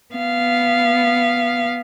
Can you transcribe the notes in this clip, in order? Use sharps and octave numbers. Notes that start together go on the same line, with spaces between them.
B3 F5